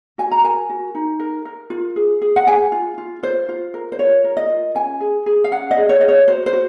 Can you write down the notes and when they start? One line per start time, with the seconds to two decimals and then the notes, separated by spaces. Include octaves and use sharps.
0.18 F#4 G#5
0.31 A#5
0.43 A#4 G#5
0.70 F#4
0.95 D#4
1.20 A#4
1.45 A#4
1.70 F4
1.96 G#4
2.22 G#4
2.36 F#5
2.47 G#4 G#5
2.72 F4
2.98 F4
3.23 F4 C5
3.49 F4
3.74 A#4
3.92 C5
3.99 F4 C#5
4.24 A#4
4.37 D#5
4.50 F4
4.75 C#4 G#5
5.01 G#4
5.26 G#4
5.44 F5
5.51 C#4 F#5
5.71 D#5
5.77 G#4
5.89 C#5
6.01 G#4 D#5
6.08 C#5
6.28 F#4 C5
6.46 C5
6.53 F#4